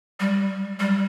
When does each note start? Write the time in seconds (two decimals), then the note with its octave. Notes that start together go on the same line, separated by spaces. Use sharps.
0.20 G3
0.80 G3